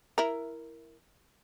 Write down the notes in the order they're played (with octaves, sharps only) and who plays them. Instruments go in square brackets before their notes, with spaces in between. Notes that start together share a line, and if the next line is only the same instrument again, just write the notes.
[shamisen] E4 A#4